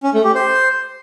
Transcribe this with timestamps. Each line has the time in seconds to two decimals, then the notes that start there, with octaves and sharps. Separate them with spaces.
0.03 C#4
0.14 A3
0.24 G4
0.35 C5